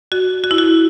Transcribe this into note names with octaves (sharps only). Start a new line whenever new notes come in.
F#4
F#4
E4
F#4